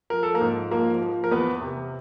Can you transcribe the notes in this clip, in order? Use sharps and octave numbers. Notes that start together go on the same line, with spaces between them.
F3 A#4
A4
A#3 A#4
G#2
F3 A#3 A#4
F3
A#4
E2 B3 B4
C3